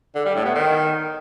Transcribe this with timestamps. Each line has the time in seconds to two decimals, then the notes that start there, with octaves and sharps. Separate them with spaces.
0.15 D3
0.25 G3
0.35 A2
0.45 B3
0.55 D#3